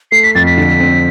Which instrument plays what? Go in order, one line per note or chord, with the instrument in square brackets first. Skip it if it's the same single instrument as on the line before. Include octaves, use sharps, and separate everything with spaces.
[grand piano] A3 [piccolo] C7
[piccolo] B6
[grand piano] F2 [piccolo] A6
[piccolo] B6
[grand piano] D3
C4